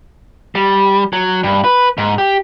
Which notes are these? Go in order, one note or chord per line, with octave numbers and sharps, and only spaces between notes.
G3
F#3
G2
B4
G#2
G4